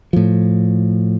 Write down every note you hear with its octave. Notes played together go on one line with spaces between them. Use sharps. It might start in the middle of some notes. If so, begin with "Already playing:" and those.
A2 F3